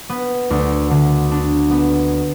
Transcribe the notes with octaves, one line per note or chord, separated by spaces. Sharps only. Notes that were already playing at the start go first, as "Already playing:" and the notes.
B3
D2
D3
D4
B3